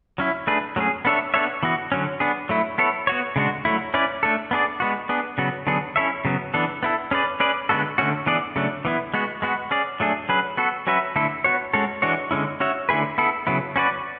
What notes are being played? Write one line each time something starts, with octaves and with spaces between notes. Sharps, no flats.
F#3 C#4 E4
A3 D4 G#4 B4
F#3 A3 C#4 G#4
B3 D4 A4 C#5 E5
B3 D4 A4 C#5 E5
E3 B3 F#4
D3 F#3 C#4
B3 D4 G#4
F#3 A3 E4
B3 E4 A4 C#5
B3 F#4 C#5
C#3 G#3 D4 F#4
F#3 A3 E4
C#4 E4 B4 D5
A3 D4 A4
B3 D4 G#4 D5
G#3 B3 F#4
B3 D4 G#4
C#3 F#3 B3 F#4
D3 F#3 B3 D4 G#4
C#4 E4 A4 C#5 E5
C#3 F#3 B3
E3 B3 D4 A4
B3 E4 A4
C#4 G#4 B4 D5
C#4 G#4 B4 D5
D3 G#3 B3 F#4 A4
D3 A3 C#4 F#4
E3 B3 D4 G#4 D5
C#3 F#3 A3 D4
E3 B3 E4
G#3 B3 F#4
G#3 B3 F#4
C#4 G#4 D5
F#3 A3 D4 G#4
F#3 C#4 G#4 B4
B3 F#4 A4
F#3 C#4 F#4 B4 E5
D3 A3 E4 A4
B3 F#4 C#5
G#3 C#4 F#4 A4 C#5
E3 G#3 D4 F#4 C#5
D3 G#3 C#4 E4
C#4 F#4 C#5 E5
D3 A3 E4 G#4 B4
B3 E4 A4
C#3 F#3 B3 E4
C#4 F#4 B4 D5